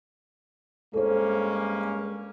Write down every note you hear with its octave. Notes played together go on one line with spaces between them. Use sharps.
G2 G#3 A#3 C#4 A4 C5